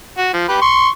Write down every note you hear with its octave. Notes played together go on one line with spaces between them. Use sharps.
F#4
F3
G4 B4
C6 C#6